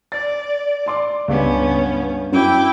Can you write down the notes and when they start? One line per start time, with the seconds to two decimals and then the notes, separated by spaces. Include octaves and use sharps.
0.12 D5 A6
0.86 D5 C6 D6
1.28 C#2 G2 B3 C#4
2.32 F#2 E4 G5 D6